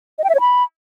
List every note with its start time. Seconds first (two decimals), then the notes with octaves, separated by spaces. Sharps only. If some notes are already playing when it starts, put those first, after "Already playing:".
0.19 D#5
0.24 G5
0.29 E5
0.35 C#5
0.40 B5